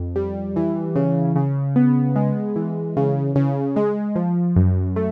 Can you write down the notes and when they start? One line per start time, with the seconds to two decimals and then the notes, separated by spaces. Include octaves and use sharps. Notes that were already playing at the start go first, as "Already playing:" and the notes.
Already playing: F2
0.16 G3
0.56 E3
0.96 C#3
1.36 C#3
1.76 B3
2.16 G#3
2.56 E3
2.97 C#3
3.35 C#3
3.76 G#3
4.16 F3
4.56 F#2
4.96 A3